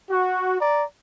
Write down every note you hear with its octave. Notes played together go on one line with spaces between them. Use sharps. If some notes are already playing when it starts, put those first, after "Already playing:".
F#4
D5 A#5